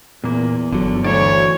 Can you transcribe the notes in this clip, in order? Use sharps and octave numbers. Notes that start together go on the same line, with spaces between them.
E2 A#2 A#3
G1 D3 F#3
D2 E3 C#5 D5